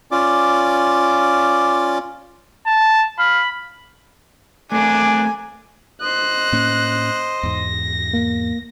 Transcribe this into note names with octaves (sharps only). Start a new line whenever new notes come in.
C#4 F4 D5 D6
A5
F5 B5
A3 C4 D4 A#4 G#5
C5 D#5 F#6
A2 A#3 C#4
E2 G#2 A#6
A#3